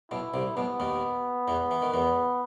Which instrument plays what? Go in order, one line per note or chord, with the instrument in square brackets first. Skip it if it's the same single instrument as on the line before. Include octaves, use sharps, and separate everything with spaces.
[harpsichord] B1 B2 [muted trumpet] E4
[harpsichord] C2 C3
[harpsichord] B1 B2 [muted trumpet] B3
[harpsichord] D#2 D#3
E2 E3
E3
D#3
[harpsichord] E2 E3 [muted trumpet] B3